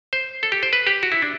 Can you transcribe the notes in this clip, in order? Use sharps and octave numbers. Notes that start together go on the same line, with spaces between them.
C5
A4
G4
C5
B4
G4
F#4
E4
D4